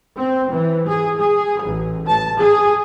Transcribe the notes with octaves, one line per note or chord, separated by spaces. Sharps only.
C4
E3
G#4
G#4
A1
A5
G#4